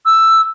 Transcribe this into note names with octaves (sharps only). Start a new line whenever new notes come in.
E6